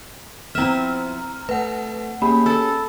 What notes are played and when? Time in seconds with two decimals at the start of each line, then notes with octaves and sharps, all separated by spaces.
0.55 F3 B3 C4 E4 E5 A#5 F6
1.49 A3 B4 F#5
2.22 A#3 C#4 G4 G#4 B5
2.46 A4 E6